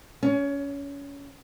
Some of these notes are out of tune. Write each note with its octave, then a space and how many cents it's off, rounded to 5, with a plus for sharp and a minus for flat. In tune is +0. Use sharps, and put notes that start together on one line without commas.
C#4 +25